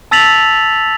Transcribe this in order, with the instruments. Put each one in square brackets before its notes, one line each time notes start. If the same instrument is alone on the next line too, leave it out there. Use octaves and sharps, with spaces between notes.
[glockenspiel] A5 E6 A6 B6 F7 F#7